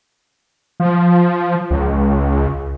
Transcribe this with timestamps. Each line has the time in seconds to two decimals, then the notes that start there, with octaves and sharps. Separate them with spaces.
0.80 F3
1.71 C#2